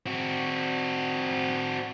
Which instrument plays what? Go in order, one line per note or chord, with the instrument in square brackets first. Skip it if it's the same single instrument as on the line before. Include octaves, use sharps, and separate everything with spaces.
[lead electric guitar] C4 F#4